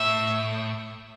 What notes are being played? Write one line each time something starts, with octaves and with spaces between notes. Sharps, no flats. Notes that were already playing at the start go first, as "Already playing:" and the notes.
Already playing: A2 E5